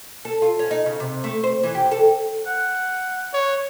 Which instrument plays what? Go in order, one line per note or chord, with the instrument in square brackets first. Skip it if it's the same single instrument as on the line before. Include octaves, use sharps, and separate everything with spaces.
[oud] A4
F4
C#4
D#4
C#3
C3
A3
C5
E3
G4
A4
[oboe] F#5
[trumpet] C#5